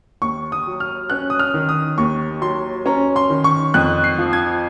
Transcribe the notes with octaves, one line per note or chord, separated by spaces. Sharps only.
D#2 C#6
D#6
F#3
F6
C#4 F#6
D#6
F6
D#3
D#6
D#2 C#6
F#3 C6
C#4 A#5
C6
D#3
C#6
F2 F#6
C7
F3
G#6